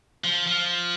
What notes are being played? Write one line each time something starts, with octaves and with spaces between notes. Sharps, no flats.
F3
F3